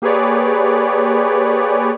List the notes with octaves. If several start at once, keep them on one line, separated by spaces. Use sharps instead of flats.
A#3 G4 G#4 B4 C#5 D5